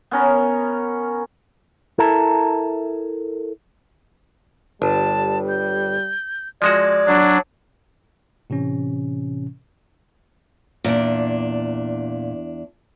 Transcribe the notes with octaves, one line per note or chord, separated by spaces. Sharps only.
B3 C#4 A#4
E4 A4 A#4
G1 G3 A5
G6
F3 G#3 F#4 D5 G#6
F#3 D4
A2 C3 E3 C#4
E2 A#2 D4